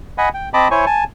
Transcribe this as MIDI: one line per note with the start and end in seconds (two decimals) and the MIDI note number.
0.18 0.29 75
0.18 0.29 78
0.18 0.29 80
0.18 0.29 83
0.34 0.49 79
0.54 0.68 60
0.54 0.68 75
0.54 0.68 81
0.54 0.68 83
0.54 0.68 86
0.71 0.85 64
0.71 0.85 72
0.71 0.85 73
0.71 0.85 80
0.71 0.85 85
0.86 1.04 80
0.86 1.04 81